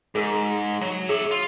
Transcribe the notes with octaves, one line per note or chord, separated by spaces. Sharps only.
G#2 G#4 A#4
F#3
G#4 C#5 E5
F4